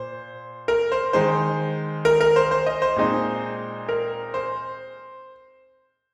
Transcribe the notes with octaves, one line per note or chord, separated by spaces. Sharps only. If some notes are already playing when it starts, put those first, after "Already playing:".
Already playing: A#2 C5
A#4
C5
D#3 G#3 D#4 C5
A#4
A#4
C5
C5
D#5
C5
A#2 G#3 C4 D#4
A#4
C5